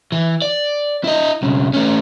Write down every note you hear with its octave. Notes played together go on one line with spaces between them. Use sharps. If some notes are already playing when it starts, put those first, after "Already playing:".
E3
D5
E4 D#5
B1 C#3
A3 C#4